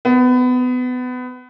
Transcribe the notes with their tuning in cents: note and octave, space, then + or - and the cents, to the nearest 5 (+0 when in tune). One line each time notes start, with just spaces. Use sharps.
B3 +25